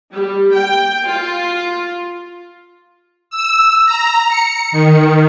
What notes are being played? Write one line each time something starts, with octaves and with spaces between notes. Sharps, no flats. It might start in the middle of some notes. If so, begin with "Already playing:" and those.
G3
G5
F4
E6
A#5
C#7
D#3